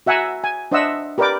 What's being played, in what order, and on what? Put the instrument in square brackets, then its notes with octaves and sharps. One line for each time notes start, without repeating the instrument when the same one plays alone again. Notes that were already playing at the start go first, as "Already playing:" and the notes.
[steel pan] F#4 E5 F#5 G#5 A#5 E6
G#5
D4 C5 D#5 E5 F#5 E6
G4 A#4 B4 D5 G5 D6